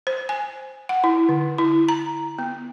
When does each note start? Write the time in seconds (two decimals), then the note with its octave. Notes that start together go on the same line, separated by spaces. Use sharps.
0.07 C5
0.29 G#5
0.89 F#5
1.04 E4
1.29 D3
1.58 E4
1.89 A#5
2.39 B3